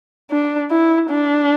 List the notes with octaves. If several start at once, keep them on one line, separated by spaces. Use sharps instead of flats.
D4
E4
D4